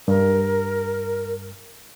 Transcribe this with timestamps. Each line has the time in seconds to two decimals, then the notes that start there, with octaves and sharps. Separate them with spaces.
0.08 G2 A#4